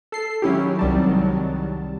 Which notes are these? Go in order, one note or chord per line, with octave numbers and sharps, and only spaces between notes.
A4 C7
D#3 F#3 G#3 C#4 E4 G4
C2 G3 A5